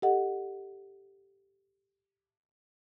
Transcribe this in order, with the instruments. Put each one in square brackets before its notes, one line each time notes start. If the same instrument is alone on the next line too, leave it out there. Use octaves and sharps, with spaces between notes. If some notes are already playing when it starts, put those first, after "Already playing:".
[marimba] G4 A4 D#5 F#5